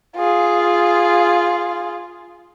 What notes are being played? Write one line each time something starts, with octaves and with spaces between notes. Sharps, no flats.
F4 G#4